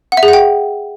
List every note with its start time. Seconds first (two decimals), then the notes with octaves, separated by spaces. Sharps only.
0.12 F#5
0.17 E5
0.23 G#4
0.28 F#5
0.33 G5